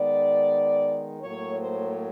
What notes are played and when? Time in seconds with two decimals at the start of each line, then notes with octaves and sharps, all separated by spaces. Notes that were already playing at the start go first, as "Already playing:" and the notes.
Already playing: D#3 G#3 B3 D5
1.23 A2 F#3 A#3 C#5
1.60 C5